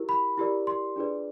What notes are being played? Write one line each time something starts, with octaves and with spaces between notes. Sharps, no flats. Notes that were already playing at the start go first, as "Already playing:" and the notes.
Already playing: E4 G4 A#4
B5
E4 G4 A#4 D5
C6
D4 F4 G#4 B4 D5